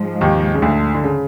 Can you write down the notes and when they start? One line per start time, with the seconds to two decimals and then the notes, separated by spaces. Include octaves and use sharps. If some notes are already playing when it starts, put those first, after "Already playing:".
Already playing: G#2 F3 G#3
0.21 D#2 D#3
0.54 C#3
0.62 D2 D3
0.95 D3
1.04 C#3